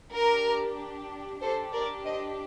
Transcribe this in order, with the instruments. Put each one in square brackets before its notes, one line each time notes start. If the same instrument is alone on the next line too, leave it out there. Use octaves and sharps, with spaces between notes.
[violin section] D4 G4 A#4
D4 G4 A4 C5
A#4 D5
C5 D#5